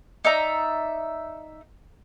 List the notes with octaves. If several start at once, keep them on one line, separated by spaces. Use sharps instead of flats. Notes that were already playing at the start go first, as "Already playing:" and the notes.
D#4 D5 E5 A#5